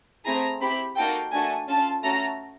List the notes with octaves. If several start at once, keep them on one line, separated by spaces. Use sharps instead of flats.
A3 C4 E4 G#4 A#5
C4 E4 G4 B5
A#3 D#4 F#4 A4 G5
A3 D4 F#4 A4 G#5
C#4 F4 A4 A5
A3 C#4 F#4 A4 A#5